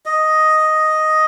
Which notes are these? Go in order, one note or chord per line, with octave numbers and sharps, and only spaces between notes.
D#5